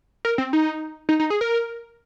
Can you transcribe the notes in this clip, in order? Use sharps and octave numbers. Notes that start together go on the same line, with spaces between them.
A#4
C4
D#4
D#4
D#4
G#4
A#4